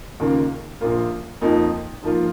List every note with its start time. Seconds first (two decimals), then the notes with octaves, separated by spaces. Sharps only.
0.20 D#2 C#3 A#3 F4
0.81 A#1 A#2 A#3 F4
1.41 F2 F3 A#3 D#4
2.02 G#2 F3 A#3 F4